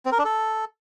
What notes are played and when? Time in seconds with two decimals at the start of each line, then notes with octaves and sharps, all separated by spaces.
0.06 C4
0.12 A#4
0.18 D4
0.25 A4